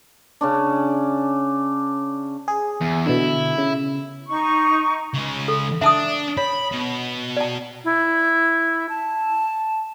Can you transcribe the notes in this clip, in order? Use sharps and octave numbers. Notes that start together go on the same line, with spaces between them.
C#3 C#4 D4
G#4
E2
B2 D3 E4
C#3
D#4 C#6
C#3 G#3
A4
D4 E5 A5 D#6
C#5 B5
B2
D5 A5
E4
A5